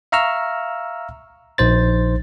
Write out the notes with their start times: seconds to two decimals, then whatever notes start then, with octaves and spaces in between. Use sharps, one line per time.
0.12 E5 F5 A#5 C#6 E6 F6
1.58 A#1 D#4 C5 A6